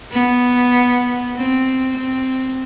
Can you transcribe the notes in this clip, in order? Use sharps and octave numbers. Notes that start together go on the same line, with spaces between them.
B3
C4
C4